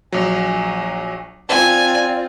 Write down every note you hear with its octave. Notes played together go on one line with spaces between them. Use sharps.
A#1 F#3 G#5
C4 F4 D5 G#5 A5